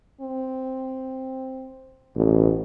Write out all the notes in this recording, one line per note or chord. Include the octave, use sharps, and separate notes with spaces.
C4
A1 B2